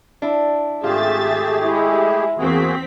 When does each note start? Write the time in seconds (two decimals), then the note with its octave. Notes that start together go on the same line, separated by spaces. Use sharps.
0.22 D4 E4
0.84 G#1 A3 F4 G4 G#4 E5 A6
1.63 G#3 E4
2.38 E2 A#3 C4 F#4 G#4 B6